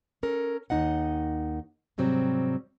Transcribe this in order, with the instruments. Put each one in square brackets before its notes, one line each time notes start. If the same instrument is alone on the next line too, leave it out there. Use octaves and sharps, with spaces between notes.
[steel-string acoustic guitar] C#4 A4 A#4
D#2 D#4 D#5 F#5
G#2 C3 F#3 G3 C4